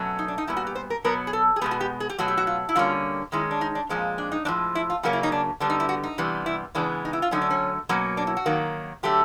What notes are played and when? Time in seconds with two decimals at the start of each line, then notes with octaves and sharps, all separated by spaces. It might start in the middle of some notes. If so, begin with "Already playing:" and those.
Already playing: B2 F#3 A3 C#4
0.19 D#4
0.28 D4
0.38 D#4
0.47 A#2 G3 B3 E4
0.57 F#4
0.67 G4
0.75 C5
0.90 A#4
1.04 B2 F#3 B3 A#4
1.27 G#4
1.33 A4
1.56 G#4
1.61 B2 G#3 B3 G4
1.71 F#4
1.80 G4
2.00 G#4
2.09 G4
2.19 B2 F#3 A3 F#4
2.28 G4
2.37 F#4
2.47 F4
2.69 E4
2.76 D3 G3 A#3 C#4 F4
3.32 D#3 G#3 C#4 E4
3.51 D4
3.61 D#4
3.75 D4
3.89 A#2 F3 G#3 C4 C#4
4.18 D4
4.32 D#4
4.45 A2 F3 G#3 D4
4.75 E4
4.90 F4
5.03 C#3 F#3 A#3 C#4 F#4
5.13 E4
5.23 D#4
5.32 D4
5.60 D3 G3 B3 D4
5.70 D#4
5.80 E4
5.89 F#4
6.03 D#4
6.18 C3 E3 G3 B3
6.46 E4
6.75 C#3 E3 G#3 B3 D4
7.05 D#4
7.13 E4
7.22 F4
7.31 D3 F#3 A3 C#4 D#4
7.42 D4
7.50 C#4
7.89 B2 F#3 A#3 C#4
8.17 D4
8.27 E4
8.37 F#4
8.46 D#3 F#3 A#3
9.03 D3 F#3 A3 G4